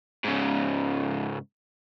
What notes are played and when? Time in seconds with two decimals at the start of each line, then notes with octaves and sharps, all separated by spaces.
0.24 G#2 C#3